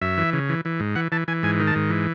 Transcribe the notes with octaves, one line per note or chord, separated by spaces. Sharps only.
F#2 E5
E3
C#3
E3
E3
G#2
E3 F#5
E3 A5
E3 G#5
G#2 G#5
D#3
A5
G#2
E3